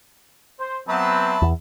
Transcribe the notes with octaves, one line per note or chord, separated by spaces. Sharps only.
C5
F#3 B3 C4 E5 A5 B5
E2